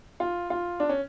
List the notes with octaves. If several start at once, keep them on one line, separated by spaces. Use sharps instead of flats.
F4
F4
D4
C#4